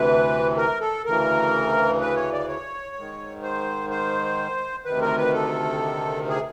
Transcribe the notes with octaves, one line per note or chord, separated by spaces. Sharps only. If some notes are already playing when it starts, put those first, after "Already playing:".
Already playing: D2 C3 E3 B4
A#4
A4
D2 C#3 E3 A#4
B4
C#5
D5
C#5
G#2 D#3
C5
C5
D2 C3 D#3 B4
A#4
B4
A4
G#4